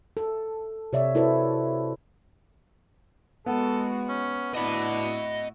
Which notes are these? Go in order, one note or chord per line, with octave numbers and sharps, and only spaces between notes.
A4
C3 C#5 D5 E5
E4 F#4 A4 B4 C5 D5
G#3 B3 F#4 A4
C#4
A2 D4 E4 F#4 D#5 B5